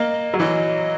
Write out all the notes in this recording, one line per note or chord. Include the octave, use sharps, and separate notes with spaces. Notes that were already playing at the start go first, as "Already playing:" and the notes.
Already playing: A#3 D#5
F#3
E3 D#5